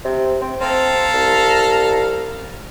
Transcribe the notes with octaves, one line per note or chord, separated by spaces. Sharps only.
C3
C4
C4 A4 F5 A#5
C2